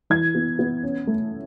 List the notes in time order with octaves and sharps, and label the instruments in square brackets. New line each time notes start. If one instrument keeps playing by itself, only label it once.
[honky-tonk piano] E3 G#6
B3
B3
C#4
A3